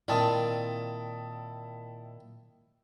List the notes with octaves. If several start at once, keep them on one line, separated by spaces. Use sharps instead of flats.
A#2 D#3 C4 E4 F4 D5 A5 D#6